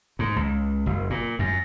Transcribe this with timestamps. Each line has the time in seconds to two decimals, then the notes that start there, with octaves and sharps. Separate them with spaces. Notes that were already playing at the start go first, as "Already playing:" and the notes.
0.19 G#2
0.36 C#2
0.86 F#1
1.10 A#2
1.39 F#2